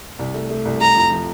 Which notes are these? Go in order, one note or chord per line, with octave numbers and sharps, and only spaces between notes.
C2
A3
A3
C2
A3 A#5
F2
F3